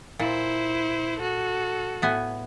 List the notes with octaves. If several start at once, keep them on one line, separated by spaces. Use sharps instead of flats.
A#2 E4 C5
F#4 A4
A2 B3 G#5